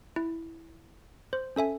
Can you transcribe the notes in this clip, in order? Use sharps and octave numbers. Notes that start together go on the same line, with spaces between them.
E4
C5
C#4 A4 E5 G#5